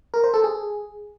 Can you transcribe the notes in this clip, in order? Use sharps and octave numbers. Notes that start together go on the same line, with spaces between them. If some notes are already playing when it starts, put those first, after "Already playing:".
A#4
C5
A4
G#4